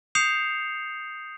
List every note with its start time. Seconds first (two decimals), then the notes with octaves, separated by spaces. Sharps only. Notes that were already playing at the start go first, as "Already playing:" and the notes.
0.15 D#6 G6 C7 C#7 E7 F7